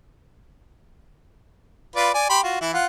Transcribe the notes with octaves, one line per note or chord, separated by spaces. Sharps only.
F4 B4 D5
D5 G#5
G4 B5 C6
F4 F#4
E3 E4
F4 F#5